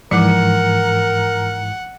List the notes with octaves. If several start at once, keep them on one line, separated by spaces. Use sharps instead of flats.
G#2 E3 F3 A#4 F#5 C#7